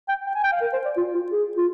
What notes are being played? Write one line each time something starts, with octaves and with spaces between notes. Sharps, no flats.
G5
G5
G#5
G5
F5
A#4
C5
D5
F4
F4
G#4
F4